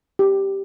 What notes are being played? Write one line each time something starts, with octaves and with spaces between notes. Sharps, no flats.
G4